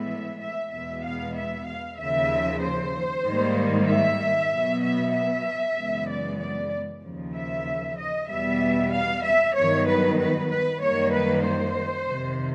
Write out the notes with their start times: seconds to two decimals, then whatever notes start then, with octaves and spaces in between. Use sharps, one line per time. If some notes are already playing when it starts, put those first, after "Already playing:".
Already playing: A2 E3 G#3 B3 E5
0.41 E5
0.72 E2 B2 G#3 B3 E5
1.04 F5
1.36 E5
1.67 F5
1.99 D#2 C#3 F3 E5
2.62 C5
3.25 G#2 D#3 G3 A#3
3.88 E5
4.51 B2 F#3 B3
4.83 E5
5.14 E5
5.77 F#2 C#3 E3 G#3 B3
6.09 D5
6.40 D5
7.03 D#2 C#3 F3
7.35 E5
7.98 D#5
8.30 E2 B2 G3 B3 E5
8.92 F5
9.24 E5
9.55 G2 D#3 F#3 B3 C#5
9.87 B4
10.19 B4
10.50 B4
10.81 F#2 D#3 G3 A#3 C#5
11.14 B4
11.45 C5
12.08 F2 C3 D#3 G3